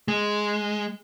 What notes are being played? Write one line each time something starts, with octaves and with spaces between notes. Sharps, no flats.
G#3